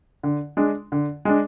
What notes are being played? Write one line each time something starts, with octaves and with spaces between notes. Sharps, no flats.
D3
G#3 D4
D3
G#3 D4